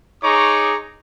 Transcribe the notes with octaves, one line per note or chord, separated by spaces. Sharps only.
D#4 G#4 C#5 A#5 C#6 D6